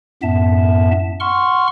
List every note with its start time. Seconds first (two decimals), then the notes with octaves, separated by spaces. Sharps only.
0.23 F#2 A2 B3 E5 A5
1.20 F#5 C6 C#6 F6